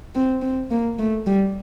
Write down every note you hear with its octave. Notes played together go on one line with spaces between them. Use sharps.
C4
C4
A#3
A3
G3